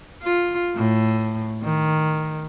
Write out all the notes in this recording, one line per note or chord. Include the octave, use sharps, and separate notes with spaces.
F4
A2
D#3